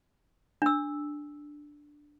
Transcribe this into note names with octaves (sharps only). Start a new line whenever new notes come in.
D4 E6